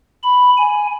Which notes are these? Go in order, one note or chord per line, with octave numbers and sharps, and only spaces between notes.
B5
G#5